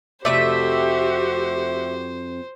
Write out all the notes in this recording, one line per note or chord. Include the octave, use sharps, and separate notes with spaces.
F2 C3 A3 F#4 G4 C5 D5 E5